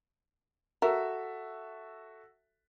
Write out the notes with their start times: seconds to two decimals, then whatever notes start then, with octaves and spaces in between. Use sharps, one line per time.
0.82 F#4 A4 A#4 E5